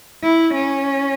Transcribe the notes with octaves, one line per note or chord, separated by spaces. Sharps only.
E4
C#4